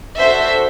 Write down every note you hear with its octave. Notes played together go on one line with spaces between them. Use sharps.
D4 F#4 A4 C5 E5